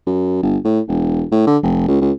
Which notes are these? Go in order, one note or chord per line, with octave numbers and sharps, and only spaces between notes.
F#2
G1
A2
E1
A2
D3
F1
C#2
C#2